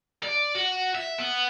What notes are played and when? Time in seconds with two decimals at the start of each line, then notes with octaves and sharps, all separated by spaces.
0.23 D5
0.55 F#4
0.95 E5
1.19 B3